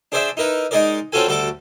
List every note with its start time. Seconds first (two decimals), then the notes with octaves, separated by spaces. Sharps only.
0.12 D4 G#4 C5 D5 E5
0.37 D#4 E4 A#4 B4
0.71 G#3 D#4 G#4 A#4 D5
1.12 C4 C#4 F4 F#4 A4 G#5
1.27 D2 G3 F#4 A4 D5